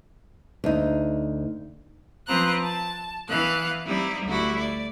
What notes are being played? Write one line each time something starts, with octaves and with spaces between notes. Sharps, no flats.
D2 D#4
F3 C4 B4 C5 A#5 F#6
A5
E3 B3 F5 F#6
G3 C4 D#4 E4
D2 G3 E4 F#4
D5